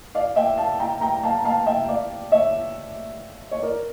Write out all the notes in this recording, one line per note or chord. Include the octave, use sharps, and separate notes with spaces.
D5 F5
E5 G5
F5 A5
G5 A#5
G5 A#5
F5 A5
F5 A5
E5 G5
D5 F5
C#5 E5
C#5
A#4 D5